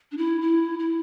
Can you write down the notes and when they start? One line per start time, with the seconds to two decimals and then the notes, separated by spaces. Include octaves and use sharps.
0.12 D4
0.17 E4
0.42 E4
0.79 E4